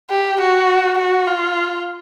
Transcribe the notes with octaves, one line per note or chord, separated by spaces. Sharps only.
G4
F#4
F#4
F4